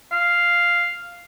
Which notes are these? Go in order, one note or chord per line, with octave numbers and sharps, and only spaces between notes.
F5